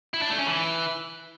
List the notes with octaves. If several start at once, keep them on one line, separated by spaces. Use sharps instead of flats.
E4
D4
A3
C#4
E3